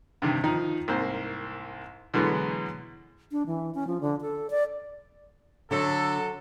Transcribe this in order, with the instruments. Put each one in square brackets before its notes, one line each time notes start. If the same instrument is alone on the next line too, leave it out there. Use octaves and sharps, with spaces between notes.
[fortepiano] G2 C3 D#3
D#3 F3 D#4
C2 G#2 A#3 C5
B2 D3 E3 F#3 G#3 B3
[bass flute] D4
E3
C#4
F3
D3
A4
D5
[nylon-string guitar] D3 [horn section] F#3 A4